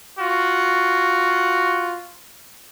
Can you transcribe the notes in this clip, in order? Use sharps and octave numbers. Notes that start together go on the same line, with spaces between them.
F4 F#4